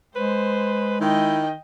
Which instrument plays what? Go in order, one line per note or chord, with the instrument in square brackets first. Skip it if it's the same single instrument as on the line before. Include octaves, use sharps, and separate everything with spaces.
[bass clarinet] G#3 [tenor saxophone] B4 [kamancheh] C5
[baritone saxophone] D#3 [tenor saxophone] E4 [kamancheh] D#5 G5